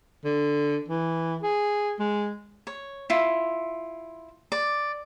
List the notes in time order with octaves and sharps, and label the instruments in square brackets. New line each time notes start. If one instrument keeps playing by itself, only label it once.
[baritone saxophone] D3
E3
G#4
G#3
[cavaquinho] C#5
E4 F4
D5